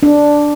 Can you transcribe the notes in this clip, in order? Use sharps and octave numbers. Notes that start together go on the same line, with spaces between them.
D4